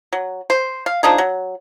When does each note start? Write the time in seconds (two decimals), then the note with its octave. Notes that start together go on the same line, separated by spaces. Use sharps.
0.13 F#3
0.50 C5
0.86 F5
1.03 F3 D4 D#4 G#4
1.18 F#3